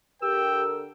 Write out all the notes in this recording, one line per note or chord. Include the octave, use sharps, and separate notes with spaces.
D3 G4 A4 A#4 G5 E6